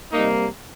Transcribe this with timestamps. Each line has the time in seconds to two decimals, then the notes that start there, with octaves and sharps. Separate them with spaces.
0.12 C3 G3 A#3 D#4